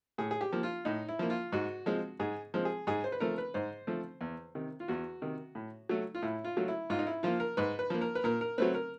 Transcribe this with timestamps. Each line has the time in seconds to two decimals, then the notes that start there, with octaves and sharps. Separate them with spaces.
0.18 A2 G#4
0.31 G#4
0.41 G4
0.53 F3 A#3
0.63 F4
0.85 A2 D#4
1.09 E4
1.19 F3 A#3
1.30 F4
1.52 G#2 F#4
1.86 F3 G#3 C4
2.20 G#2 G#4
2.54 F3 G#3 C4
2.65 G#4
2.87 G#2 G#4
3.04 C5
3.12 B4
3.20 F3 A3 C4 A#4
3.38 B4
3.54 G#2 C5
3.87 F3 A3 C4
4.21 E2
4.55 C3 D#3
4.80 F4
4.88 E2 F#4
5.22 C3 D#3
5.55 A2
5.89 F#3 A3
6.15 F4
6.22 A2 E4
6.44 F4
6.57 F#3 A3
6.68 E4
6.90 G#2 F4
6.99 D#4
7.07 E4
7.23 F3 A#3 F4
7.40 A#4
7.57 G#2 B4
7.79 B4
7.90 F3 A#3
8.01 A#4
8.15 B4
8.24 A#2 A#4
8.41 A#4
8.58 F#3 A3 C4 B4
8.75 A#4